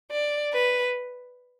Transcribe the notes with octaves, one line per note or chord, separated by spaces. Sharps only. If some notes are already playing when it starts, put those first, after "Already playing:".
D5
B4